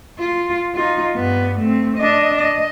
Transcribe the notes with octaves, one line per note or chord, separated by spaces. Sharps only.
F4
D#4 F4
G2 B3
A3 C4
D4 D#5
D#5